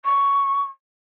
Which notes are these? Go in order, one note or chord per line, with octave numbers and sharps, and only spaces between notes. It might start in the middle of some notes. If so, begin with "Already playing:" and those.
C#6